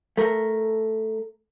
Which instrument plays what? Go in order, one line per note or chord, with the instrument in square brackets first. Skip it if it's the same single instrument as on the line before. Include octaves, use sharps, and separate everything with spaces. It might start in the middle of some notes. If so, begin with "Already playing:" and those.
[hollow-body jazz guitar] A3 A#4